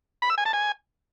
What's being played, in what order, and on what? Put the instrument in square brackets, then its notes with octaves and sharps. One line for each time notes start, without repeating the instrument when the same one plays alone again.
[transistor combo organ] B5
E6
G#5
A5
G#5